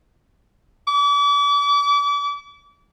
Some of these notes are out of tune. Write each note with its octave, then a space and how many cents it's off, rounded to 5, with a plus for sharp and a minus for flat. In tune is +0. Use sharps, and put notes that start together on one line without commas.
D6 -40